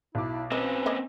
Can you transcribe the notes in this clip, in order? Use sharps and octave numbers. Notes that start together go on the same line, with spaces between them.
B1 E4 D6
C4 C#4 B4 D#5
A#3 D#5